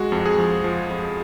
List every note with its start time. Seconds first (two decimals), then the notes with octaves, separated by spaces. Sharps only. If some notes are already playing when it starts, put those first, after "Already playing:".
Already playing: G#3 F#4
0.12 F2
0.25 G#4
0.38 F3
0.64 F3
0.91 F2